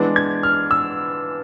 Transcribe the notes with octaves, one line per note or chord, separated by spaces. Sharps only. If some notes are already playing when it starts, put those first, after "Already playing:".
Already playing: E3 G#3 B3 D4
G#6
F6
E6